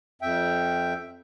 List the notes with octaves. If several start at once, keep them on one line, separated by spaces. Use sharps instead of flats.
F2 E5 G5